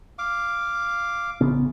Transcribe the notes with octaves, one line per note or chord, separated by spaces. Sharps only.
F5 D6
A1 C#3 B3